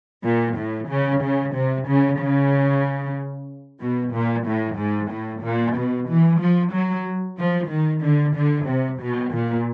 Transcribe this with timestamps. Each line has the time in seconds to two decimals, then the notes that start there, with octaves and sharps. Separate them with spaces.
0.24 A#2
0.57 A2
0.89 C#3
1.21 C#3
1.54 C3
1.87 C#3
2.19 C#3
3.81 B2
4.14 A#2
4.46 A2
4.78 G#2
5.11 A2
5.43 A#2
5.75 B2
6.08 E3
6.40 F3
6.73 F#3
7.38 F3
7.70 D#3
8.02 D3
8.35 D3
8.67 C3
9.00 B2
9.32 A#2